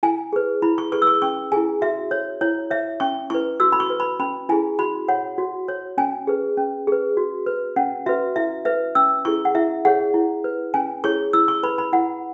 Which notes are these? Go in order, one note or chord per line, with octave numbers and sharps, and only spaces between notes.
E4 G#5
G#4 B4
E4 B5
C#6
G#4 B4 C#6
E6
C#6
C#4 C#6
E4 G#4 G#5
F#4 E5
C#5
E4 C#5
C#5 E5
C#4 C#6
E4 B4 C#6
F#4 E6
B5
C#6
B4
B5
C#4 B5
E4 G#4 G#5
F#4 B5
C#5 F#5
F#4
C#5
C#4 G#5
G#4 B4
C#4
G#4 B4
F#4
B4
C#4 F#5
F#4 B4 E5
E4 E5
B4 E5
C#4 E6
E4 G#4 C#6
F#5
E4 E5
G#4 C#5 F#5
E4
B4
C#4 G#5
E4 G#4 C#5 C#6
E4 E6
C#6
B4 B5
B5
E4 F#5